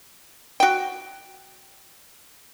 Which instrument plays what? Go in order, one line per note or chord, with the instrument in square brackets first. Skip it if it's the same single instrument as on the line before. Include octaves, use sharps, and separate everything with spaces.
[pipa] F#4 G5